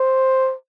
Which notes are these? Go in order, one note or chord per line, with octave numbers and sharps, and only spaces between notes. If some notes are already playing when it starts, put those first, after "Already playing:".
Already playing: C5